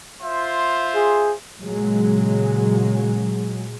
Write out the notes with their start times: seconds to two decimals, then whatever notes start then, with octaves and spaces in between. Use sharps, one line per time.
0.21 F4 C5 E5
0.95 G#4
1.59 A#2 C#3 F#3 G#3